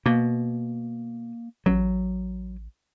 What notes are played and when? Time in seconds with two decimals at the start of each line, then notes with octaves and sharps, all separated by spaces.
0.06 B2 A#3
1.66 A1 F#3